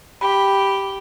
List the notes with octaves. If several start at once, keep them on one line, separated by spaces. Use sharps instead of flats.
G4 B5